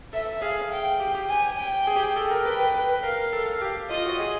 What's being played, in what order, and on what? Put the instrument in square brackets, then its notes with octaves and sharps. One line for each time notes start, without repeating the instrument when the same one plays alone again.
[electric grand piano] A4 [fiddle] E5
[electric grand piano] G#4 [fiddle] F5
[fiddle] G5
[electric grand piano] G4
G4
[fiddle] G#5
G5
[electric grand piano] G#4
G4
G#4
A4
A#4
[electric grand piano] B4 [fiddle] G5
[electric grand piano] B4
B4
B4
[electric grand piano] A#4 [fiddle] F5
[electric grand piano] A4
G4
[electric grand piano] F4 [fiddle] D#5
[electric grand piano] F#4
G#4